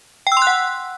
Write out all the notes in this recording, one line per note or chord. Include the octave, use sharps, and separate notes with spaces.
G5
E6
C6
F#6
F#5